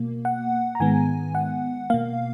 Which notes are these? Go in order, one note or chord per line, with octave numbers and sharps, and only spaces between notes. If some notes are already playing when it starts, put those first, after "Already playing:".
Already playing: B2 A#3
F#5
A#5
G#2 D#3 G#3 B3 G#5
F#5
B2 A#3 F5